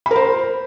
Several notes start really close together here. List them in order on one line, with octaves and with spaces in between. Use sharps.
B5 A#4 C5